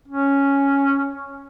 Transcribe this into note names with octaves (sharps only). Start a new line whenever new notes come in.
C#4